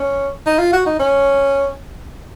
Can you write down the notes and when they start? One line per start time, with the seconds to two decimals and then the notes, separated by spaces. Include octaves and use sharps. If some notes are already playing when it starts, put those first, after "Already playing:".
Already playing: C#4
0.46 D#4
0.59 F4
0.73 F#4
0.86 D#4
0.99 C#4